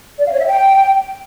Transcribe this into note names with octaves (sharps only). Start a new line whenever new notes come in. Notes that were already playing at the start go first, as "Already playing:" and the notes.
D5
F5
C#5
E5
G5